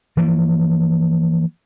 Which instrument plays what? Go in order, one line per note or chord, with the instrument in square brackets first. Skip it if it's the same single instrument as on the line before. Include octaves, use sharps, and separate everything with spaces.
[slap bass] E3 F3 A#3